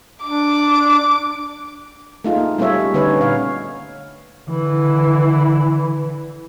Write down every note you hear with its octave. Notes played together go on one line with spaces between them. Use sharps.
D4 D6
A3 D#4 F4 G#4
A#3
G3 A3 C#4 F4 C#5 E5
D3 B3 C#4 D#4 B4 C#5
A#2 C#5 F5
D3 E3